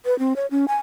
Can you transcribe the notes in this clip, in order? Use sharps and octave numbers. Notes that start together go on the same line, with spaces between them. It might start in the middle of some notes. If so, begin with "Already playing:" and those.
B4
C4
C#5
C#4
G#5